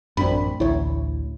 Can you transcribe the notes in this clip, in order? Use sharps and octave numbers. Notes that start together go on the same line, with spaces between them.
A1 F#2 C4 D4 B5
A1 D2 E4 C#5